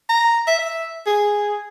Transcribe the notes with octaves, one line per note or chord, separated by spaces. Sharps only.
A#5
E5
E5
G#4